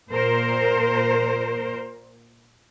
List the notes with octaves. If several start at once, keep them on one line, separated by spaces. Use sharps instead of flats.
A#2 A#4 C5